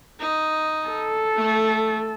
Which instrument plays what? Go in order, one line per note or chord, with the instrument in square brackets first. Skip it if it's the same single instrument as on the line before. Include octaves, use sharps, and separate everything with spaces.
[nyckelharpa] D#4
[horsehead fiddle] A4
[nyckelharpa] A3